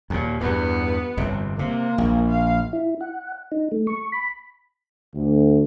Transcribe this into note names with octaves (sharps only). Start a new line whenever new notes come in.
D#2 A#2
E2 G2 B3
G1 F2 C3
C3 A#3
A#1
F5
E4
F#5
D#4
A3
C#6
B5
D2